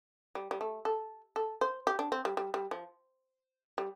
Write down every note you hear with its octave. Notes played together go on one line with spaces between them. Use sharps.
G3
G3
A3
A4
A4
C5
G4
D4
C4
G3
G3
G3
F3
G3